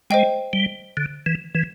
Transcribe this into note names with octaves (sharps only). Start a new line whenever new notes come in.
G#3 C5 D#5 G5
G3
D3
E3
E3